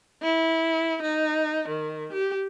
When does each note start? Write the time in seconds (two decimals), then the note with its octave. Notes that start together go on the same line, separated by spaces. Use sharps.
0.22 E4
1.02 D#4
1.69 D#3
2.13 G4